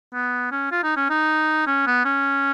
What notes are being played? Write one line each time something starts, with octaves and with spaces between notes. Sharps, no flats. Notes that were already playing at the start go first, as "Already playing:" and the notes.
B3
C#4
F4
D#4
C#4
D#4
C#4
B3
C#4